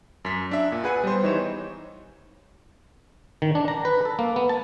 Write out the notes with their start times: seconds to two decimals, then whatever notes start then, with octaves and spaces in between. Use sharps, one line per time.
0.25 F#2 B6
0.51 D4 E5
0.72 A#2
0.84 G#4 B4 F#5 G#5
1.04 G3 B3 C5
1.23 E3 D#4 C#5 E7
3.42 D#3
3.55 D4
3.68 A#5
3.85 B4
4.05 A4
4.19 A#3
4.36 B3
4.49 A5